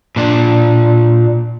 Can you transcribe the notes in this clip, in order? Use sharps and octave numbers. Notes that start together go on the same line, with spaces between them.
A#2 D4